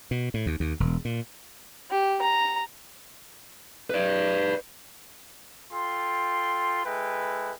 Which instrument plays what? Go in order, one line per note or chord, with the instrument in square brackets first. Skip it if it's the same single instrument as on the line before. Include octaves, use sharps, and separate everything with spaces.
[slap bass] B2
A2
D#2
D#2
E1
A#2
[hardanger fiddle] G4
A#5
[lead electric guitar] B4 D5
[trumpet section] F4 A4 G5 C6
G#3 E4 A4 B4 G5